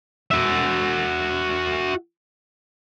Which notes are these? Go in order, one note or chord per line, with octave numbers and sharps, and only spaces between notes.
F#4 E5